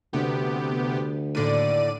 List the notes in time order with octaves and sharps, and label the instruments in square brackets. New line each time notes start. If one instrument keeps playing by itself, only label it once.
[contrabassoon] D2 [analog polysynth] C3 B3 G4
[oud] D#2 D3 [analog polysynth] A2 D5 D#7